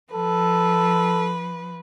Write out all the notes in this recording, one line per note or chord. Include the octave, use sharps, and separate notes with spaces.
F3 A4 B4